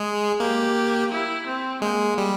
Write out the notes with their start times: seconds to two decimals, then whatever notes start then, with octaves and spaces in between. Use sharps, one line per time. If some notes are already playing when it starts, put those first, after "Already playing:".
Already playing: G#3 G#4
0.40 A#3 G4
1.11 E4
1.46 C4
1.82 G#3 A#3
2.18 G3